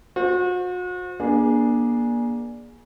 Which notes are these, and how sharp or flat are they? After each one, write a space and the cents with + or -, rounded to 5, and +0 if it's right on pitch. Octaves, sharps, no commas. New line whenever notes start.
F#4 -40 C5 +0
A#3 +35 D4 +0 G#4 +0